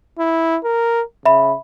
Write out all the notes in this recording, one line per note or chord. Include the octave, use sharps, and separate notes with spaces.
E4
A#4
C#3 E5 B5